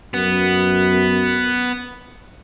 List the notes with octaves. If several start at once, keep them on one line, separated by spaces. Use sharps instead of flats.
F#2 B3